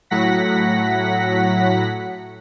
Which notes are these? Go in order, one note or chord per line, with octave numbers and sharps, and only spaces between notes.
A2 F#3 F#5 A#6 B6